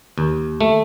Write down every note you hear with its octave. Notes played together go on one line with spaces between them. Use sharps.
D#2
A3